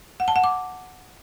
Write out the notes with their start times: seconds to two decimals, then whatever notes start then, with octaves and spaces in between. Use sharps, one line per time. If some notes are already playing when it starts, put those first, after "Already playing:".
0.20 F#5
0.28 A5
0.36 F#5
0.44 D6